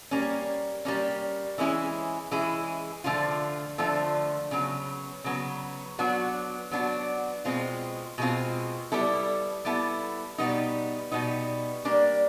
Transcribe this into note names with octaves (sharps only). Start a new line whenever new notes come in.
G3 A#3 C#4
G3 A#3 C#4
E3 G#3 C#4 E4 G#4
E3 G#3 C#4 E4 G#4
D3 F3 A3 D4 F4
D3 F3 A3 D4 F4
C#3 F#3 B3
C#3 F#3 B3
F#3 B3 D4 F#4
F#3 B3 D4 F#4
B2 G#3 C4 F4
B2 G#3 C4 F4
G3 B3 E4 A4
G3 B3 E4 A4
B2 G3 B3 D#4
B2 G3 B3 D#4
G3 A#3 D4